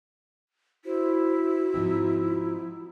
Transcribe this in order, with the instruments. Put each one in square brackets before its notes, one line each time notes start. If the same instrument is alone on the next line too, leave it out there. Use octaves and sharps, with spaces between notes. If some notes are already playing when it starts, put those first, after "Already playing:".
[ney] E4 [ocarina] F#4 [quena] C5
[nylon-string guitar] G#2 F3 C4 [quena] D#4